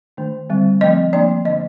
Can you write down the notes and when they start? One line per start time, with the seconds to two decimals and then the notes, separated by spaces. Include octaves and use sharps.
0.17 D#3 A3 D4
0.50 D3 G3 C4
0.81 F3 A3 C4 D#5
1.13 F3 A#3 D4 D5
1.45 D3 F3 A#3 D4 D#5